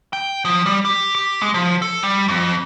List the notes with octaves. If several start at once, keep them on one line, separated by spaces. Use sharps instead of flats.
G5
F3
G3
G4
G4
G#3
F3
A4
G3
F2